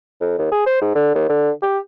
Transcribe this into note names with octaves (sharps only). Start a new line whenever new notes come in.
F2
D#2
G#4
C5
G#2
D3
D#2
D3
G4